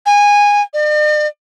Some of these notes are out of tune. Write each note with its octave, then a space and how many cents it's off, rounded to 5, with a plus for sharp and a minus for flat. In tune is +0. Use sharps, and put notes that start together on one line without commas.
G#5 -15
D5 +45